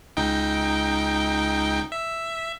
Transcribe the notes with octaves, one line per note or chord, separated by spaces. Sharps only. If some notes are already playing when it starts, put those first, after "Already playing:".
C#2 D#4 G5
E5